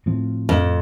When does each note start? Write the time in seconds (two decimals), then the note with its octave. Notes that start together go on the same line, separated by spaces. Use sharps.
0.06 A2 F3 C4
0.49 F2